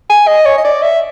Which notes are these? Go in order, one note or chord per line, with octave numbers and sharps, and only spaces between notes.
G#5
D#5
C#5
D#5
D5
E5